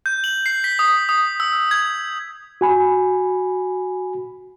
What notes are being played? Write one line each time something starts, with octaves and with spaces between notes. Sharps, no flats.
G6
F#7
C7
B6
D#6
D#6
E6
G#6
F#4 G#5 B5